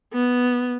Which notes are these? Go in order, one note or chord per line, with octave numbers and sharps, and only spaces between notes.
B3